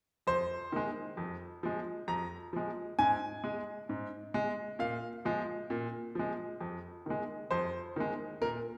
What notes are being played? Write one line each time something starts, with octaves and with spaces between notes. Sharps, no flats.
F2 C5
D#3 G#3
F2
F3 G#3
F2 A#5
F3 G#3
G#2 G#5
G#3
G#2
G#3
A#2 F5
F3 G#3
A#2
F3 G#3
F2
D#3 G#3
F2 C5
D#3 G#3
A#2 A#4